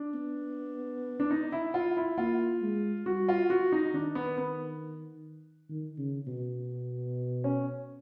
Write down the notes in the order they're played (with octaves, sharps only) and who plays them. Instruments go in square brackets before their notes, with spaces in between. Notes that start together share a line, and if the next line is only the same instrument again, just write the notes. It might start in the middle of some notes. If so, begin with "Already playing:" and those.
Already playing: [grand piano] D4
[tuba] B3
[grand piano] D4
D#4
E4
F4
E4
[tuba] A#3 [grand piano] F4
[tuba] G#3
[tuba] G3 [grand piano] F#4
[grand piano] F4
F#4
D#4
[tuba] D#3 [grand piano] D4
[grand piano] B3
B3
[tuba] D#3
C#3
B2
[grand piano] C#4